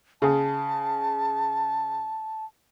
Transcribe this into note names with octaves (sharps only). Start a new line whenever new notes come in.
C#3 G#4 A5